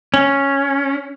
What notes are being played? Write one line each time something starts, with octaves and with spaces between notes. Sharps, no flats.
C#4